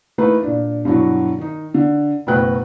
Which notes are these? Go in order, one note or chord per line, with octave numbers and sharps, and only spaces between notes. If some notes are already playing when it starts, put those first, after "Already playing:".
E3 A3 A#3 D#4 B4
A#2 D4
G2 B2 E3 F#3
D#3 D#4
D3
F#1 B2 A3 B4 G5 F#6